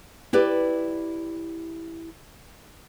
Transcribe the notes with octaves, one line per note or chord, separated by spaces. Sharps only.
E4 G4 B4 D5